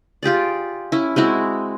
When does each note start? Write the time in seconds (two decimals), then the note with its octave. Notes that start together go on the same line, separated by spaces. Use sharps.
0.23 F4 G4 G#4 D5
0.92 C#4 E4
1.16 G#3 C4 E4 F#4